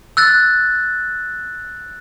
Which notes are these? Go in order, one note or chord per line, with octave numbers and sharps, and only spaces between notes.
E6 F#6 A6